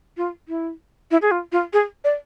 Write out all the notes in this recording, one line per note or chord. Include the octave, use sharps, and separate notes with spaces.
F4
E4
E4
G#4
F4
F4
G#4
D5